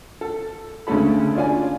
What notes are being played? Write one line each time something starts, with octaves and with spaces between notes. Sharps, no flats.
A4
D2 C#3 G#3 C#4 A4 B5
C#4 D4 F4 C#5 D5 G#5